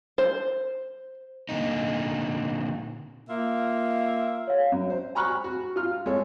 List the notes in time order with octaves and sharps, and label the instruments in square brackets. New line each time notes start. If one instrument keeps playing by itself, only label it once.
[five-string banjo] C5
[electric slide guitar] A#2 D3 D#4
[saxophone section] A#3 F4 E5
[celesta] C#5 F5
[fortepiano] F#2
C5
G#5 A#5 B5 C#6 F6 F#6
F#4
F4 F6
G#3 A4 C#5